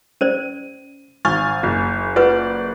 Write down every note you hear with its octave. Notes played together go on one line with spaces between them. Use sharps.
C#4 C5 D5 D#7
G#1 G#5 C#6 F6 A6
F#1
F4 B4 D5 F#5